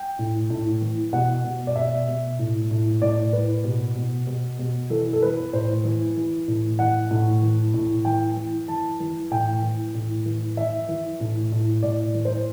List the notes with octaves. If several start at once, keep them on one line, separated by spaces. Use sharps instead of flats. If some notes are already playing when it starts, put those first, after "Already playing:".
Already playing: G5
A2
A2
E3
B2 F#5
B2
D5
B2 E5
B2
A2
A2
A2 D5
A2 B4
B2
B2
B2
B2
E3 A4
A4
E3 B4
A2 C5
E3
E3
A2
E3 F#5
A2
E3
A2
E3 G5
E3
E3 A5
E3
A2 G5
E3
A2
E3
E3 E5
E3
A2
A2
A2 D5
E3
C5